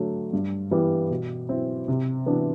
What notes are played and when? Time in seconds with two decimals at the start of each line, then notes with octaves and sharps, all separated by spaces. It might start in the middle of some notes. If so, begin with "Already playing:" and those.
Already playing: D3 F#3 A3
0.33 G2
0.71 E3 G3 B3
1.11 B2
1.49 F#3 C4 E4
1.88 C3
2.26 E3 B3 D4 F#4